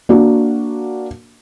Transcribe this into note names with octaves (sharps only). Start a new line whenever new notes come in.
A#3 D4 F#4